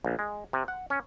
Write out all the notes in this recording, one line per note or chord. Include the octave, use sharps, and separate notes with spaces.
A#1
G#3
C3
F#5
C#4